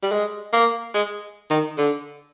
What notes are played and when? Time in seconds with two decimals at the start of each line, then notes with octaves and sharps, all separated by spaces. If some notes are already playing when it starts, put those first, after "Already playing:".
0.03 G3
0.12 G#3
0.53 A#3
0.94 G#3
1.50 D#3
1.77 D3